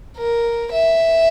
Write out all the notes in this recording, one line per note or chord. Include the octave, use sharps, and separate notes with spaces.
A#4
E5